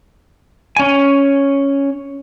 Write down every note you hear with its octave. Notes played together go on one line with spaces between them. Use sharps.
C#4 G#5